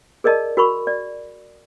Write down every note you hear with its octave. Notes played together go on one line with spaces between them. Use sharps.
G#4 A#4 D5 D#5 A5
F#4 A#4 B5 C#6
D5